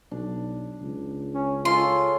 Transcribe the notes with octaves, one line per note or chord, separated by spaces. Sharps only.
B1 D4
C#2
C#4
G#3 F4 A4 C#5 C6